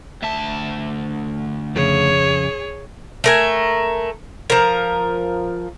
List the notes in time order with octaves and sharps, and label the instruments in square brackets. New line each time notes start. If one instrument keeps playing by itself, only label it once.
[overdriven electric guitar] D2 A5 [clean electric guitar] E5
[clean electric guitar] F2 C#3 [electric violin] G#4 C#5
[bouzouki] A3 A#4 G#5
F3 A#4